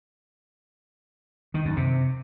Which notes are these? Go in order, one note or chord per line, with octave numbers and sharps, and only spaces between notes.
D#3
F#2
C3